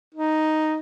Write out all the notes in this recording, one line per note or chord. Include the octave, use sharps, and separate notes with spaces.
D#4